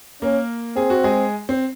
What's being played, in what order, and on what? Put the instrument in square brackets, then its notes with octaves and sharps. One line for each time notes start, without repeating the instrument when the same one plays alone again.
[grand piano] A#3 A#4 [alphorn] C#4
[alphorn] C4 [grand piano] G#4
[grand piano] F#4
G#3 G#4
C4